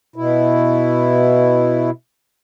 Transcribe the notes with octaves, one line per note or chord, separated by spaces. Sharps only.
B2 E4